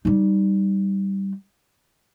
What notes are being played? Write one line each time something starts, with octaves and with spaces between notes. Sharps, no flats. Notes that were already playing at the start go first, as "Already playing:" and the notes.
G3 D#4